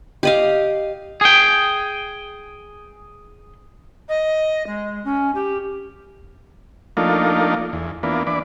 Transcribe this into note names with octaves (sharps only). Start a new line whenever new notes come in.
G4 D#5 F5
G#4 G5
D#5
G#3
C#4
G4
F3 A3 A#3 D4 D#4 F4
E2
E3 A#3 B3 D4 F4
E3 D4 B4 D5